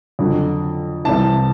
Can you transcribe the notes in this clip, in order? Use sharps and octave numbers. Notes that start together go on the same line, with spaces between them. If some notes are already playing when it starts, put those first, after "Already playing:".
F2 D3 F#3
C2 C3 E3 A5